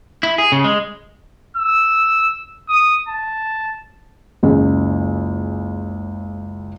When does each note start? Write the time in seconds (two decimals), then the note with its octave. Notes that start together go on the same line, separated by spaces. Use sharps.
0.23 E4
0.38 G#4
0.52 C#3
0.64 G#3
1.57 E6
2.68 D#6
3.08 A5
4.43 F#1 C#2 G#4